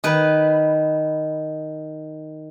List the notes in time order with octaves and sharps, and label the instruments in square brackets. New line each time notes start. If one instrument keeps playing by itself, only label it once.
[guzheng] D#3 B4